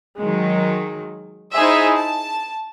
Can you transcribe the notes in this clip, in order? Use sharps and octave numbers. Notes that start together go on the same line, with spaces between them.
D#3 F#3 G#3
D#4 E4 G#4 C5 E5
A5